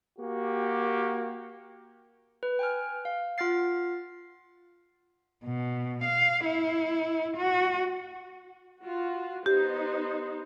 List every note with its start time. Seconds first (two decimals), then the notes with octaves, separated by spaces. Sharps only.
0.18 A#3 F#4 G4
2.43 B4
2.59 G5 G#5 F6
3.05 F5
3.38 F4 F#5 F6 A6 C7
5.44 B2
6.04 F5
6.46 E4
7.37 F#4
8.82 F4 F#4
9.46 B3 D#4 G4 C5